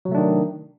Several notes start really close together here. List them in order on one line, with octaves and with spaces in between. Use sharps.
F#3 C3 A3 D4 D#3